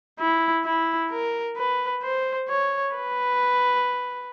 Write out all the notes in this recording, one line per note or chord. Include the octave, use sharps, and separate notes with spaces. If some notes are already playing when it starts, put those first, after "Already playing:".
E4
E4
A#4
B4
C5
C#5
B4